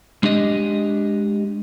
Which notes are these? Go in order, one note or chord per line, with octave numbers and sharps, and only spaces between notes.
G#3 D4 G4 D#5